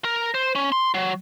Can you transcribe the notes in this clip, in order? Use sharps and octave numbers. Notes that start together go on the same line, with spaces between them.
A#4
C5
C#4
C6
F#3